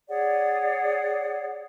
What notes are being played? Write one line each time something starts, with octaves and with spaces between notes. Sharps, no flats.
G#4 C#5 D5 F#5